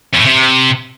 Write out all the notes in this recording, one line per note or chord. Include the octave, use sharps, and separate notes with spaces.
E2
A2
C3